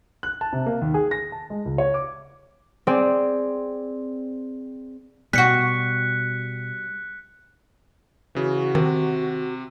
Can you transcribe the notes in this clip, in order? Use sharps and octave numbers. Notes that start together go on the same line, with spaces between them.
F#6
A5
C3
A#3
D#2
G#4
A#6
A5
G#3
C#2
C#5
D6
C4 G#4 D5
B2 G3 B3 F#4 F#6 B6 C#7
C#3 E3 F#4
C3 D#3